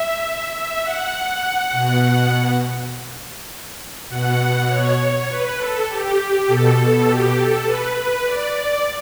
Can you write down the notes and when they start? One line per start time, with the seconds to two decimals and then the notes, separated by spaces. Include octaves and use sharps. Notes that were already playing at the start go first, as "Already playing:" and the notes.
Already playing: E5
0.53 E5
0.82 F#5
1.72 B2
4.09 B2 F#5
4.68 C#5
5.28 B4
5.58 A4
5.88 G4
6.47 B2 A4
7.07 G4
7.37 A4
7.65 B4
7.95 B4
8.25 D5
8.54 D5